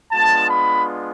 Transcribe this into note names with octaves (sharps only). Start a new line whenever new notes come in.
G#3 B3 D4 F4 A5
B5